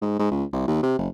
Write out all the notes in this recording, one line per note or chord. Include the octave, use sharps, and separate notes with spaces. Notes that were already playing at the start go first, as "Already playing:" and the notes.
G#2
G#2
C#2
C2
D#2
C3
F#1